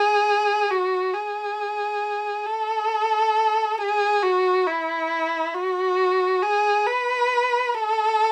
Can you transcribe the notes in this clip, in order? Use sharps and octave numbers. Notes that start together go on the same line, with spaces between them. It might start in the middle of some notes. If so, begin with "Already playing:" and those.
Already playing: G#4
F#4
G#4
A4
G#4
F#4
E4
F#4
G#4
B4
A4